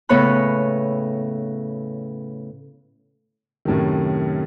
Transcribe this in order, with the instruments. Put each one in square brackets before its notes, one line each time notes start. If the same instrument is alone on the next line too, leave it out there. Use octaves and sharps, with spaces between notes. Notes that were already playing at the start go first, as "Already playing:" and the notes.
[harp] A2 C#3 B3 C#5 B5 F#6
[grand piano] F#2 A2 C3 D#3